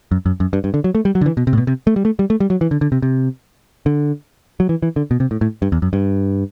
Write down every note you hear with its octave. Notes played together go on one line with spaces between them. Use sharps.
F#2
F#2
F#2
G2
G2
D3
F#3
A3
G3
F#3
D3
E3
B2
C3
A2
B2
C3
A3
G3
A3
G3
A3
G3
F#3
E3
D3
D3
C3
C3
D3
F#3
E3
E3
D3
B2
C3
A2
A2
G2
E2
F#2
G2